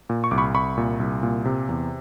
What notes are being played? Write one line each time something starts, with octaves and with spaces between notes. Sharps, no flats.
A#2
C#6
C2 D6
B5 C#6
C2 B5 C#6
A#2
C2
A#2
C3
E2